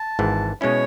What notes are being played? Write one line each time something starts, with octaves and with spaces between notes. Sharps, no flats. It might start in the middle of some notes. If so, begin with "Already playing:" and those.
Already playing: A5
G#1 G#2 E3
B2 G#3 C#4 E4 C#5